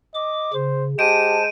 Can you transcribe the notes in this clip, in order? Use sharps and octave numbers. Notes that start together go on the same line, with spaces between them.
D#5 D6
C#3 C5
G#3 G4 C5 A5 D7 D#7